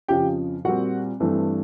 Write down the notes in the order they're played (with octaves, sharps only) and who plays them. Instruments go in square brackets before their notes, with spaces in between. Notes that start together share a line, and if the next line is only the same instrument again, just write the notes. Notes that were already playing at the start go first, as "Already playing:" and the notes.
[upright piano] F2 C#3 F3 G4 G5
A#2 G3 C4 F#4 F#5
G2 E3 A3 C4